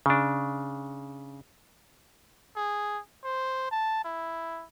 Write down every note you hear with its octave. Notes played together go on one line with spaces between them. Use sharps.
C#3 D4
G#4
C5
A5
E4